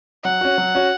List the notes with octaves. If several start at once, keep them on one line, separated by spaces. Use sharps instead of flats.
F#3 F#5
C#4 F#4
F#3
C#4 F#4